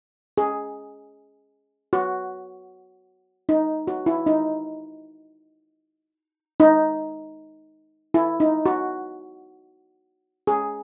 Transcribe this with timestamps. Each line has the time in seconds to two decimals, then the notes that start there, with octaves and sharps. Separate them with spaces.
0.38 G#4
1.93 F#4
3.49 D#4
3.87 F#4
4.06 E4
4.26 D#4
6.60 D#4
8.14 E4
8.40 D#4
8.66 F#4
10.47 G#4